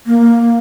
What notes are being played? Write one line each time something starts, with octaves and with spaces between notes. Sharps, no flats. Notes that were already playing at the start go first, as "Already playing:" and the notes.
A#3